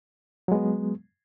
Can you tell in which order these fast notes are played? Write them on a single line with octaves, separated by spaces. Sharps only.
F#3 G#3 B3